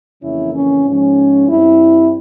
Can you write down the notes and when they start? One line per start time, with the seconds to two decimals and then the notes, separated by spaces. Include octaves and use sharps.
0.22 F2 C#3 E3 A#3 C#4 E4
0.53 C#4
0.86 G#2 F3 G#3 C#4
1.48 G2 G3 C4 E4